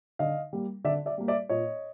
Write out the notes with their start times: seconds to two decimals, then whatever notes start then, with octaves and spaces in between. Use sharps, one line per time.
0.19 D3 D#5 F5
0.53 G3 A#3
0.84 D3 D5 E5
1.06 D5 E5
1.18 G3 A#3
1.28 D5 E5
1.49 A#2 C#5 D#5